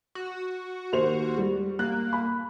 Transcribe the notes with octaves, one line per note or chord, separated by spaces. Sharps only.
F#4
D#2 C5 F7
G3
A#3 F#6
B5